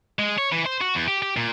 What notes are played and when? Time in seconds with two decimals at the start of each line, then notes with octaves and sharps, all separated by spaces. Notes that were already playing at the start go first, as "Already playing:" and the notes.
0.19 G#3
0.38 C#5
0.52 E3
0.66 C5
0.81 F#4
0.95 E2
1.08 G4
1.22 G4
1.37 A#2